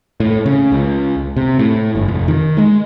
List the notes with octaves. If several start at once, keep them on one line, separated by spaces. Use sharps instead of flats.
A2
C#3
C#2
C3
A2
G1
F1
D#3
G#3